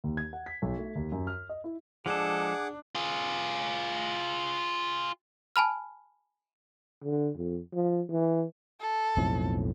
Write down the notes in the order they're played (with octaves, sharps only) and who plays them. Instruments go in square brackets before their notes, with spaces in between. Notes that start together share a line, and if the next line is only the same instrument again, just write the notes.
[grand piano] D#2
G#6
F#5
B6
B1
A3
D#2
F#2
F6
D#5
E4
[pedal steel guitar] F3 G#3 A4 [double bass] D4 [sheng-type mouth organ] G#4 F#5 D6
[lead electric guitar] F4 G#4
[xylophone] G#5 A5 B5 F6
[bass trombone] D3
F2
F3
E3
[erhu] A4
[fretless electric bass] B1 F2 A2